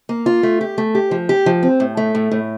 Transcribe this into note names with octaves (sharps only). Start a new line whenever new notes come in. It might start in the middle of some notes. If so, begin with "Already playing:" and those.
A#3
F4
A3
G4
A3
G4
F3
G4
F3
C4
A2
A3
A2
A2